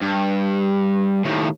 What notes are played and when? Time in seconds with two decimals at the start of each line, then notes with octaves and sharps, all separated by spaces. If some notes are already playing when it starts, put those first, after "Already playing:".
0.02 G2
1.25 D#2 A2